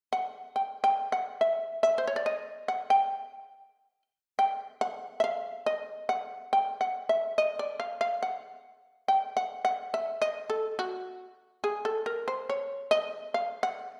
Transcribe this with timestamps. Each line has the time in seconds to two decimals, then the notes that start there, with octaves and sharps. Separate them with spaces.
0.13 F#5
0.56 G5
0.84 G5
1.12 F#5
1.41 E5
1.83 E5
1.98 C5
2.07 C#5
2.16 D5
2.26 D#5
2.68 F#5
2.90 G5
4.39 G5
4.81 F#5
5.20 E5
5.24 F5
5.66 D#5
6.09 F#5
6.53 G5
6.81 F#5
7.09 E5
7.38 D#5
7.59 D5
7.80 F5
8.01 F5
8.23 F#5
9.08 G5
9.37 F#5
9.65 F#5
9.94 E5
10.22 D#5
10.50 A4
10.79 F#4
11.64 G#4
11.85 A4
12.06 A#4
12.28 C5
12.50 C#5
12.91 D#5
13.34 F5
13.63 F#5